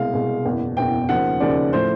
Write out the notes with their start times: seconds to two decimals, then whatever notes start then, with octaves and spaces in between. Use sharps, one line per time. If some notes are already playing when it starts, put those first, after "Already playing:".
Already playing: C2 B2 G#3 F5
0.14 C2 B2 G#3
0.45 F#1 E2 B2
0.77 F#1 E2 B2 G5
1.08 D#2 C#3 F3 F#5
1.40 D#2 C#3 F3 D5
1.73 A2 F3 A3 C5